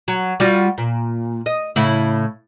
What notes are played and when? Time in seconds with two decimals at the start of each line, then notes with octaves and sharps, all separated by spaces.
0.08 F#3
0.40 G3 F4 F#4
0.78 A#2
1.46 D#5
1.76 A2 C#3 E4